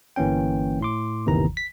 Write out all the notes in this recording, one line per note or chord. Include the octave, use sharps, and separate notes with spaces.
G1 E3 A#3 C#4 G5
A2 C6 D6
G1 D#2 C3 D#3 E3 A#5
B6